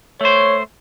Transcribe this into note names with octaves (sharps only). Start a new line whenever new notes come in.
A3 C5 C#5